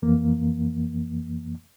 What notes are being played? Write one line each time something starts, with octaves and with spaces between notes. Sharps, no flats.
F2 E3 A#3